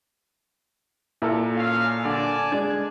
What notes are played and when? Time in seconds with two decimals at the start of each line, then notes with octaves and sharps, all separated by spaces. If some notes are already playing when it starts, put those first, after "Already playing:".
1.22 A#2 E4 A4 A#4
1.55 C#4 F5
2.05 D3 D5 G#5 A5
2.52 G#3 D4 G#6